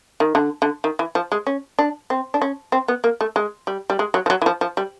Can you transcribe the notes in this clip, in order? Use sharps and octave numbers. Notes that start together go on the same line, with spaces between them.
D#3
D3
D3
D#3
E3
F3
G#3
C#4
D4
C4
D4
C#4
C4
B3
A#3
A3
G#3
G3
G3
G#3
F#3
F3
F#3
E3
F3
F3
G3